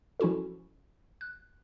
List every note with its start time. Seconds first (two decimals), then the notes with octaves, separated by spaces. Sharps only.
0.20 F3 C#4 E4 F#4 A4
1.21 F#6